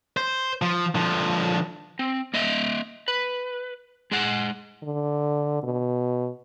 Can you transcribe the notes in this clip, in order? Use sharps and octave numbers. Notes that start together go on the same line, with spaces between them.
C5
F3
D3 F3
C4
A#3 D#5 E5
B4
G#3 G#4 F#5
D3
B2